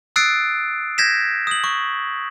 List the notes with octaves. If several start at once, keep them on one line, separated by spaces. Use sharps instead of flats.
D#6 E6 F#6 A6 C7 D7
G6 G#6 A#6 B6 E7
D#6 F#7
C#6